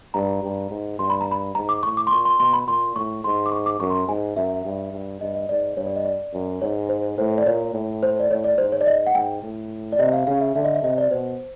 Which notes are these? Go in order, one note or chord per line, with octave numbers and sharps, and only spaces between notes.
G2 A#5
G2
G#2
G2 C6
B5
A#5
B5
G#2 A#5
D6
A2 C#6
D6
C6
A#2 C#6
C6
B2 C6
B5
A#2 C6
A2 C#6
G#2 C6
D6
C#6
D6
F#2 C#6
C6
G#2 G#5
F#2 E5
G2
G2
G2 D#5
D#5
G#2 D5
G2 C#5
D5
D#5
D5
F#2
G#2 C#5
C5
A2 C5
D5
A#2 C#5
A2
C5
D5
A2 C#5
D5
G#2 C5
C#5
D5
D#5
F#5
G#2 G5
A2
D5
C3 D#5
F5
C#3 F5
E5
D3 E5
D#5
E5
C3 D#5
D5
B2 C5